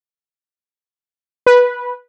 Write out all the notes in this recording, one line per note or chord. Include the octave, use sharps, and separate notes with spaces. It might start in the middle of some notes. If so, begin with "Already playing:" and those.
B4